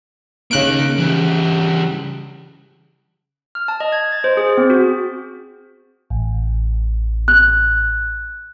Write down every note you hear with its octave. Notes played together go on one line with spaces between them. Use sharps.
C#3 A#3 D#4 F#6 D7
E3 G3
F6
A5
D#5
G#6
A6
C5
G#4
C4
F#4
A1
F#6